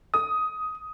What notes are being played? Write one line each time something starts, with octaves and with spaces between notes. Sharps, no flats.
D#6